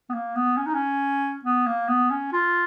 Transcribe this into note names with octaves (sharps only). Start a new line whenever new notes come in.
B3
A#3
B3
C#4
D#4
C#4
B3
A#3
B3
C#4
F4